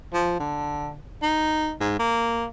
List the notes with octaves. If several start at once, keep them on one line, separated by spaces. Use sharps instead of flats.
F3
D3
D#4
G#2
A#3